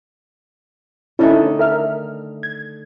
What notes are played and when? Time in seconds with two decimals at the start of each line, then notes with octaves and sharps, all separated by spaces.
1.19 D3 D#3 A3 C#4 E4
1.59 A#4 E5 F6
2.43 G#6